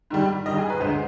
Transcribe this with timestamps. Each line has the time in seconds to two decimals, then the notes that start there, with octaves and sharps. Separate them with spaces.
0.10 G#2 D#3 G3
0.46 G#2 D#3 G3 D#5
0.58 G#4
0.70 B4
0.81 D2 D3 G#3 C5